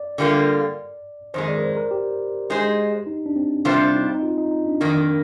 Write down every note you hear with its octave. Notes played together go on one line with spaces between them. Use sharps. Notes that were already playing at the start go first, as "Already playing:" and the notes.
Already playing: D5
D3 G3 A#3 F4
F2 D#3 G#3 C5
D5
A#4
C5
A#4
G4
G#3 D#4 G#4 C5
D#4
D4
C4
C3 G3 C4 D4 F4 C5
D#4
D#4
F4
D#4
D#4
D4
F2 D#3 A#3 D4